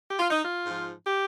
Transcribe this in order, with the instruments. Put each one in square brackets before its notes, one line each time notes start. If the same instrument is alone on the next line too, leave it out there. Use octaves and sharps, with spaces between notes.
[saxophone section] G4
F4
D#4
F4
G#2 F3
G4